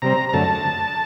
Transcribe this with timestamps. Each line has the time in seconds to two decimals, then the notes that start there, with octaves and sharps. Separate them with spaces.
0.02 C3 G3 C4 A#5
0.29 A#5
0.33 F#2 D3 A3 A5